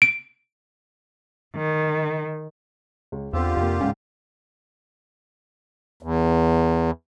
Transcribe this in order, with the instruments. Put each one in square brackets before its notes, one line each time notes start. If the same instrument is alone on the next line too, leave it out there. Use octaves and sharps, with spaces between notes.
[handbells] D7
[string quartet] D#3
[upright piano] C#2
[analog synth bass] E2 [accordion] D3 F4 G4 [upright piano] C4 E6
[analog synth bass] F2 [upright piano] C3 A#3
[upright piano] C#2 G#2 [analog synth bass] C#4
[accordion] E2